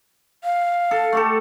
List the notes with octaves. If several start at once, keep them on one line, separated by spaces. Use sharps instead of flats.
F5
A4
A3 G4 A4